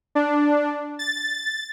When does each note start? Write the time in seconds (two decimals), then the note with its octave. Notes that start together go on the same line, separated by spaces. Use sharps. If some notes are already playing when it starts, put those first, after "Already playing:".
0.15 D4
0.99 A6